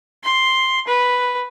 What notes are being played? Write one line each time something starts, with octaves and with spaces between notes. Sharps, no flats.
C6
B4